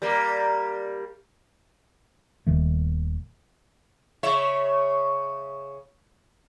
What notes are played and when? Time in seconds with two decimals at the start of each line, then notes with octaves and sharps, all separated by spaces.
0.02 G3 A#3
2.47 D#1 D#3 A3
4.23 C#3 C#5 E5